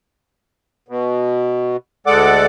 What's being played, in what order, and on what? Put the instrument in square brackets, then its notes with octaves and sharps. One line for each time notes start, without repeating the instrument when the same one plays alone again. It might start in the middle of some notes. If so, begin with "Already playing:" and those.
[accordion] B2
D2 G#3 A4 D5 F#5 D6